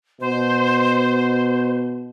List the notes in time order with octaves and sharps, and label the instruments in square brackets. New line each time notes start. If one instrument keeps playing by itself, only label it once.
[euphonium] B2 [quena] C5